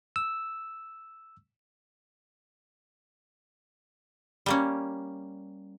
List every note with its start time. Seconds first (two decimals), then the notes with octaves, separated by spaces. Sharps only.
0.16 E6
4.46 G3 A#3 C#4